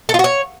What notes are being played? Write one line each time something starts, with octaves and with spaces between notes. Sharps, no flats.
A4
F4
F#4
C#5